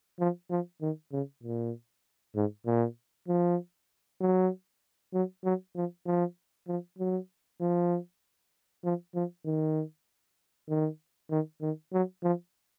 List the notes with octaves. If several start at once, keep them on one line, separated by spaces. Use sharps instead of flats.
F3
F3
D#3
C#3
A#2
G#2
A#2
F3
F#3
F#3
F#3
F3
F3
F3
F#3
F3
F3
F3
D#3
D#3
D#3
D#3
F#3
F3